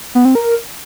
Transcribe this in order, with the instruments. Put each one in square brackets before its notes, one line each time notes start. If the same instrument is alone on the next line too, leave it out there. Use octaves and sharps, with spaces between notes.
[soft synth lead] B3
C4
A#4